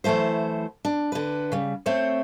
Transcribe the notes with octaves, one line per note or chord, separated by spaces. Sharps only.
E3 F#3 A3 E4 C5
D4
D3 B4
C#3 G3
A3 C4 C5 C#5